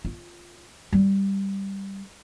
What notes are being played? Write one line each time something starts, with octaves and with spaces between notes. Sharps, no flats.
F4
G3